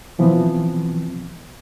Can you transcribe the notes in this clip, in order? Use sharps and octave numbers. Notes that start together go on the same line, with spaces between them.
B2 E3 F3 B3 C4